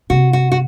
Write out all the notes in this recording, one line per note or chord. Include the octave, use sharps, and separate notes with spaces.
C3 F#4
F#4
F#4